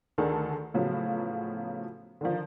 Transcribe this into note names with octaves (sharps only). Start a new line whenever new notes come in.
D2 D3 D#3 G#4 A4 A5
A2 C#3 F3 F#3 B3
D3 D#3 F3